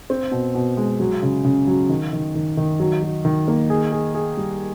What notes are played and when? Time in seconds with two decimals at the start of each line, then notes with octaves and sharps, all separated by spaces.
0.10 C4
0.31 B2
0.55 B2
0.77 G#3
1.00 F#3
1.23 C#3
1.45 C#3
1.67 F#3
1.89 D#3
2.13 D#3
2.35 D#3
2.57 D#3
2.80 F#3
3.02 F#3
3.25 D#3
3.48 A#3
3.70 G#4
3.92 G#4
4.14 G#4
4.37 G3